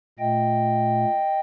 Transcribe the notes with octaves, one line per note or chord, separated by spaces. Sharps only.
A#2 A3 D#5 G5